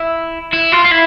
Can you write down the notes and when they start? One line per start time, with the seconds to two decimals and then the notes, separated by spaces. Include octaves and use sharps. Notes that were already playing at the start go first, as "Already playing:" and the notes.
Already playing: E4
0.53 E4
0.72 F4
0.84 F4
0.91 E4